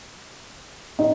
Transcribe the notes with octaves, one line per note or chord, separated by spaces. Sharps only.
D#4